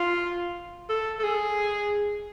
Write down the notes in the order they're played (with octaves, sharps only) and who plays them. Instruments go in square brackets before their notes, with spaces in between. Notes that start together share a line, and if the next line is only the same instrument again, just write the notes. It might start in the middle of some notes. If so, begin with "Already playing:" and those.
Already playing: [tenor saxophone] F4
A4
A4
G#4